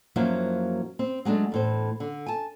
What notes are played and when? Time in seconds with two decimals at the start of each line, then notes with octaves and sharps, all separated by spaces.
0.16 F#2 F3 F#3 A#3 E4 C5
0.99 C4
1.25 F#3 G#3 A3 D4
1.52 E2 A2 C5
2.00 D3
2.26 G#5 A5